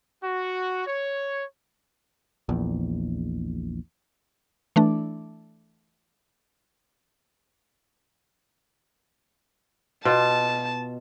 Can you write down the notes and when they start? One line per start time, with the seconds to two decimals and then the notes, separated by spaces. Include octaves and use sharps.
0.24 F#4
0.87 C#5
2.49 A#1 E2
4.76 E3 A3 D4
10.05 B2 F4 A5